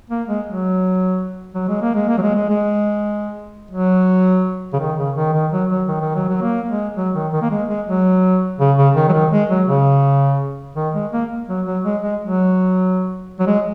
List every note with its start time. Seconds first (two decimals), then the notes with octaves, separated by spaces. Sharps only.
0.10 A#3
0.28 G#3
0.46 F#3
1.55 F#3
1.68 G#3
1.82 A#3
1.95 G#3
2.09 A#3
2.18 F#3
2.22 G#3
2.35 G#3
2.49 G#3
3.71 F#3
4.73 C#3
4.80 D#3
4.98 C#3
5.16 D#3
5.33 D#3
5.52 F#3
5.70 F#3
5.88 D#3
6.01 D#3
6.15 F#3
6.29 F#3
6.42 A#3
6.69 G#3
6.96 F#3
7.15 D#3
7.32 D#3
7.42 A#3
7.50 G#3
7.69 G#3
7.87 F#3
8.59 C#3
8.77 C#3
8.95 D#3
9.09 F#3
9.13 D#3
9.31 G#3
9.49 F#3
9.67 C#3
10.76 D#3
10.94 G#3
11.12 A#3
11.48 F#3
11.66 F#3
11.84 G#3
12.03 G#3
12.21 F#3
13.39 F#3
13.47 G#3